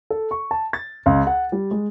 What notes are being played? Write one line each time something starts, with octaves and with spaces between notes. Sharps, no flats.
A4
C#6
A5
A6
C#2
F#5
G3
G#3